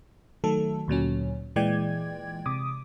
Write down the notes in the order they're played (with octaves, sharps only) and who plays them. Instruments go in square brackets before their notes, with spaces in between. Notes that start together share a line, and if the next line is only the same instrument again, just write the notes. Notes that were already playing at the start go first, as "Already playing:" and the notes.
[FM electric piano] D#3 F#3 A3 A4
D2 A#2 F#3 C#4
A#2 E3 G#3 D5 G5 G#6
C3 D6 D#6